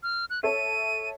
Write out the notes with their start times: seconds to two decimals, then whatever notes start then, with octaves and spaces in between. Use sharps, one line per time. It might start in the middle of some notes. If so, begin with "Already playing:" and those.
0.03 F6
0.30 F#6
0.43 A4 C#5 E5 D#7